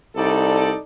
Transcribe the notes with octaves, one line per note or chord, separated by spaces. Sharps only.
C2 D#4 A4 D5